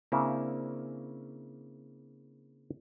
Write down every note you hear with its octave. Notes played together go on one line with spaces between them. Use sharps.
C#3 A#3 C4 D4 E4